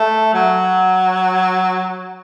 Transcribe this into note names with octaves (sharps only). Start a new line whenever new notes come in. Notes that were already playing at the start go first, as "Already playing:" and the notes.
Already playing: A3
F#3